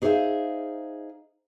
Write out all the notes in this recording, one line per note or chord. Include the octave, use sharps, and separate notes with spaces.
D#4 G#4 C5 C#5 E5 F5